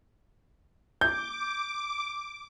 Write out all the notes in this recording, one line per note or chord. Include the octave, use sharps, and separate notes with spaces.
D6 G6